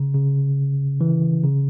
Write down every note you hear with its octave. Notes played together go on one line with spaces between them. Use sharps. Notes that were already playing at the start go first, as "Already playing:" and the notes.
Already playing: C#3
C#3
E3
C#3